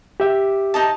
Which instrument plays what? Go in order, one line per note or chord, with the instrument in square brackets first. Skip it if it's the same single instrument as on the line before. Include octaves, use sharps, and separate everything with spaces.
[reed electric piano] G4 E5
[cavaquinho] D#4 D#5 A5